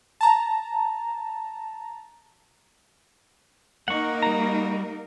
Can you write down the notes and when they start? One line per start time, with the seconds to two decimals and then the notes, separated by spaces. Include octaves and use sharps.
0.21 A5 A#5
3.88 A#3 D#4 A#4 F#5 C#6
4.23 G3 F#4 A#5